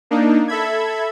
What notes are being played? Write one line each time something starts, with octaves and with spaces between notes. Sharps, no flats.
A#3 D4 D#4
A4 E5 B5 G#6